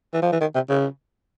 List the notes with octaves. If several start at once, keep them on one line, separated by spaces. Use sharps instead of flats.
E3
F3
E3
D#3
C3
C#3